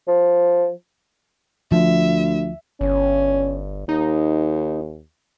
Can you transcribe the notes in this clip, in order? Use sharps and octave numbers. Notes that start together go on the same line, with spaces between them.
F3
D2 F3 E5
G1 C#4
D#2 D#4